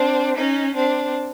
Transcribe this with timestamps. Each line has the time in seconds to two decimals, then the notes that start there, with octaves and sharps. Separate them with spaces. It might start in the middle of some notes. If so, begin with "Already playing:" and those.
Already playing: C4 D4
0.36 C#4 D#4
0.75 C4 D4